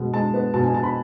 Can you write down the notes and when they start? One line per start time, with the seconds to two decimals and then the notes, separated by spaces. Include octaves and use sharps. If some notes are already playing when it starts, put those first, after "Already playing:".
Already playing: B2 G#3
0.13 G#3 A5
0.34 B3
0.54 B2 A5
0.63 G#5
0.74 B2 A5
0.83 B5